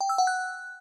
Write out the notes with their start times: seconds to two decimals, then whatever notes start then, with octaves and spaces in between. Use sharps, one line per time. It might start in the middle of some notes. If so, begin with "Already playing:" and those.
0.01 G5
0.09 E6
0.18 F#5
0.27 F#6